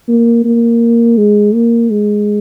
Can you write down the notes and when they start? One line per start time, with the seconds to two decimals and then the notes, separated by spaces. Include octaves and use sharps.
0.08 A#3
0.44 A#3
1.18 G#3
1.54 A#3
1.90 G#3